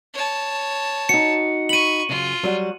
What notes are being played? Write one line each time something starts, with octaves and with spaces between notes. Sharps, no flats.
C#5 A5
D#4 F#4 C#7
B5 C#6 D#7 F#7
F#2 C#3 F4
F#3 G3 F#4